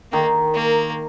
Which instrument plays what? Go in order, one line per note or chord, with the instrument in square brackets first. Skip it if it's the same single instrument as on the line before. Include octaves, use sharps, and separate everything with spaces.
[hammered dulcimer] D#3 [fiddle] A#3
[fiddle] A#3